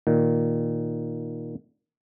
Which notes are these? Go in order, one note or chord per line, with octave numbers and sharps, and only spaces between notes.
A#2 D#3